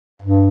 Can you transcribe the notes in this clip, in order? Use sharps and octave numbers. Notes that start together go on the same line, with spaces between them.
G2